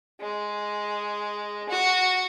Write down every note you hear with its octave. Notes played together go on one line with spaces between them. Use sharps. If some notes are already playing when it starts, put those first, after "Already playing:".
G#3
F#4